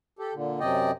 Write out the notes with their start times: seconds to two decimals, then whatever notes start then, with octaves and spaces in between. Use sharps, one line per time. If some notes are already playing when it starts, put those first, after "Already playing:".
0.19 G4 A4
0.34 A#2 D3
0.60 F#2 C3 D5 D#5 G5